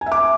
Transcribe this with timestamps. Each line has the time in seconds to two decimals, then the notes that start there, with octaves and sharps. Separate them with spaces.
0.01 G#5
0.06 E5
0.12 D6